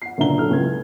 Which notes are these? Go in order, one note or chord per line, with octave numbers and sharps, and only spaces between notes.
F#5 C7
C#2 A#2 D3 E5 A#5 G7
F#3 E4 A4 F6
C#2 G#6